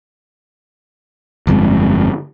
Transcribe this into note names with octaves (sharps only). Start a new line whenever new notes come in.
G1 F2 A2 G#3